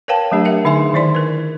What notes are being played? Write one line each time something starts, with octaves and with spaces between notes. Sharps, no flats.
A#4 B4 C#5 F5 G5 A5
F#3 A3 D4 G4
A#4 E5 F#5
D3 D#4 G#4 E5 G#5 C6
D#3 E4 C5 D5 C6
A#4 B4